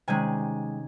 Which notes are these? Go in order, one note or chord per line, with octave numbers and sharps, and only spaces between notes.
C3 D#3 G#3 C#4 G#5